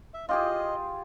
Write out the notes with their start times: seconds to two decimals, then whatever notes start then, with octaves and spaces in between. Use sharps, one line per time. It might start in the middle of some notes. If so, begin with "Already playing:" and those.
0.14 E5
0.29 F4 G4 G#4 D#5